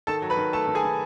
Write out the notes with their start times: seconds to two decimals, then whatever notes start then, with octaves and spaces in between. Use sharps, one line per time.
0.07 D#3 A4 A5
0.22 F#3
0.30 B4 B5
0.37 D#3
0.53 A3 A4 A5
0.67 D#3
0.75 G#4 G#5
0.84 D#3